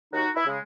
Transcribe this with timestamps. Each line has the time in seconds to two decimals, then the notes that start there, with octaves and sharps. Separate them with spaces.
0.13 D#2 D#4 F#4
0.35 E4
0.46 C#3 G#3